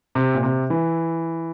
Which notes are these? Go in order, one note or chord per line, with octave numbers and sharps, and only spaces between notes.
C3
A#2
C3
E3